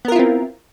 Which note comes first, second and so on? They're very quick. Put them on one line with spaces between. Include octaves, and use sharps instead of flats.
B3 A#4 F4 E4 C4